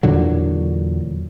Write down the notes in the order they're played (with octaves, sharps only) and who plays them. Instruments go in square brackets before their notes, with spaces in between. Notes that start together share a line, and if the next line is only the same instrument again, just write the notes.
[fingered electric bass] E2 A#2 D3 F#3